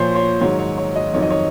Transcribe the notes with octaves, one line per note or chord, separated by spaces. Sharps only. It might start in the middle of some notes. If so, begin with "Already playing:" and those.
Already playing: A#2 F3 C5 C#5
C#5
G#2 D#3 F#3 C#5
C#5
C#5
D#5
F2 D#3 F#3 C#5
D#5
C#5